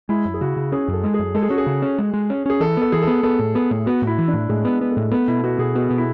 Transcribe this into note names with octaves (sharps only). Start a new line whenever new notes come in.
G#3 E4
F#2
G#4
C#3 F#4
C#3
C#4 G#4
F#2 A4
G#3
G#4
F#2
G#3 A4
G#4
C#4 F#4
G#4
C#3
C#4
G#3
G#3
C#4
C#4 G#4
E3 A4
B3 A4
E3 G#4
B3 A4
B3 A4
A2
B3 G#4
A2
B3 F#4
A2
E4
E3
D4
A2
A2 G#3
B3
B3
A3
A2
A3 B3
B2 E4
B3 F#4
B2 G#4
B3 F#4
B2
E4